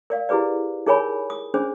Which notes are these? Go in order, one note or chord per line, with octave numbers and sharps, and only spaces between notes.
A#4 D5 F5
E4 G4 G#4 B4 D5
D#4 G#4 A#4 C#5 G#5 B5
D#6
C#4 D4 G#4 C5